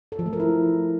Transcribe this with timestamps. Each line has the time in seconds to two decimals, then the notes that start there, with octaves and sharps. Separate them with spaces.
0.12 A4
0.19 F3
0.26 A3
0.33 A#4
0.40 E4